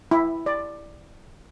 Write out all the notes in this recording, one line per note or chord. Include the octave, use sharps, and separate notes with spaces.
E4
D5